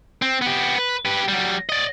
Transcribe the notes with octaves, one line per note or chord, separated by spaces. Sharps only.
C4
B3 G4
B4
G4 B4
F#3 G3
D5 D#5